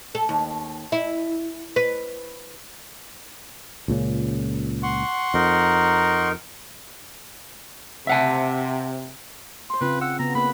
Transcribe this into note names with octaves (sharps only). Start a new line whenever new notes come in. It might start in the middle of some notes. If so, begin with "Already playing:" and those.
A4
D#2
E4
B4
C#2 A#2 C#3
F#5 C6 C#6
F2 D#4 A#4
C3 E5 F#5 A5
C5 C6
C#3 C4 F4 B4
F#5 E6
C#3 B3 A#5
A#3 B4 B5